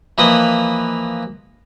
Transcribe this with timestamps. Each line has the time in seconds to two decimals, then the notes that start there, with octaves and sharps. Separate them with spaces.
0.18 E3 F3 A#3 B4 D#5 D#6